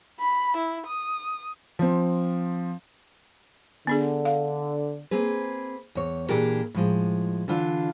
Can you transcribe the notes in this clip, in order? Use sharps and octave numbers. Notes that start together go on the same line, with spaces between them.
B5
E4
D#6
F3 C4
D3 B3 D4 G#4
F5
A#3 C4 G#4 B4
E2 C#5
A#2 E3 D4 G4 G#4 A#4
A2 F3 G#3
D3 E3 D4 F4